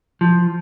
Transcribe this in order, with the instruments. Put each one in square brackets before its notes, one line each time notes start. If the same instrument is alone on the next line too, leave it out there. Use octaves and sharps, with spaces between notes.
[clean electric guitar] F3